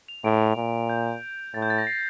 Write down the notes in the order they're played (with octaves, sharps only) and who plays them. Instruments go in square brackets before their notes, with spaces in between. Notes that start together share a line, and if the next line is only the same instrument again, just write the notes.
[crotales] F7
[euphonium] A2 [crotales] D7
[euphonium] A#2
[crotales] G6
[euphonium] A2 [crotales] A6
[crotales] G6
A6
A#6
C7